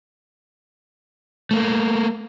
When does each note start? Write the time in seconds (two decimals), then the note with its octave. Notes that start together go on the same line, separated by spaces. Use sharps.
1.51 A3 A#3